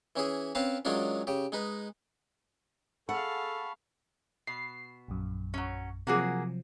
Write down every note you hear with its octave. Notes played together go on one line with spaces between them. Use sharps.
E3 C#4 E4 G#4
C4 C#4 B4 F5 A5
D#3 F#3 G#3 C#4 D4 F4
C#3 G4
G#3 D#4 B4
G#4 A4 F5 F#5 A5 B5 C#6
B2 C7
A#1 F#2
F#3 C#4
C3 F3 F#3 A#3 F#4 G#4